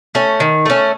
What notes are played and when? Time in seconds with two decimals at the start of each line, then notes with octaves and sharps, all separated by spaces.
0.15 A3 C#4
0.40 D#3
0.66 A3 C#4